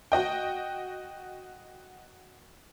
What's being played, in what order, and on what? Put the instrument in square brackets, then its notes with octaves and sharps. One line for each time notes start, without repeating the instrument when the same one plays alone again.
[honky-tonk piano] F#4 D#5 G5